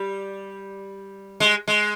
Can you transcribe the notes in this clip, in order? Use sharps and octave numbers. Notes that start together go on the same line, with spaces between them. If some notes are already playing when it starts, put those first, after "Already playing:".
Already playing: G3
G#3
G#3